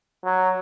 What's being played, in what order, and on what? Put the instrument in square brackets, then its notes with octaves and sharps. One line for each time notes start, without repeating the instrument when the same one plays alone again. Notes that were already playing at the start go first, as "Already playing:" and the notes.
[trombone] F#3